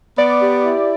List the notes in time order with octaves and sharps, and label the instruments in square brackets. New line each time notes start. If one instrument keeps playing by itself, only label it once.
[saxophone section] B3 [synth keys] D5
[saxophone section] G4
E4